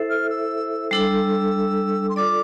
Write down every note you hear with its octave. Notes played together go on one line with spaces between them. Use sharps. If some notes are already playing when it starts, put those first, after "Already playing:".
Already playing: E4 A4 C5 E5
F6
E6
G3 D4 A4 E6
C6
F4 A4 D5 D6